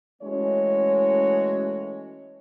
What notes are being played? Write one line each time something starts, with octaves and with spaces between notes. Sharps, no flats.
E3 G#3 A3 C#4 F#4 C#5